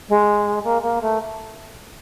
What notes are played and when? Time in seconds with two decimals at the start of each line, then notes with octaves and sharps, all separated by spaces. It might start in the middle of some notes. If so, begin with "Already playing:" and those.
0.09 G#3
0.64 A#3
0.82 A#3
1.02 A3